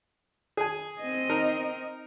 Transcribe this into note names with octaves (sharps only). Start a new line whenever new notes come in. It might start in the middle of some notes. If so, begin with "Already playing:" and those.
G#4 G#5
C4 D#5
D#4 A#4